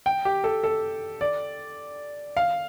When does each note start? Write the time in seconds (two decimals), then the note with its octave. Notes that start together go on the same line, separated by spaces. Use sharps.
0.06 G5
0.25 G4
0.44 A4
0.64 A4
1.21 D5
2.37 F5